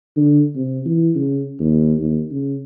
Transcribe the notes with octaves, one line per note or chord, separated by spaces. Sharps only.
D3
C3
E3
C#3
D#2
D#2
C#3